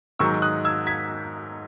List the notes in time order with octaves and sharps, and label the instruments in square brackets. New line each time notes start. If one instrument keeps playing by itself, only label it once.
[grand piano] G#2 D#3 F#3 C#6 E6
D#6 F#6
E6 G#6
G#6 B6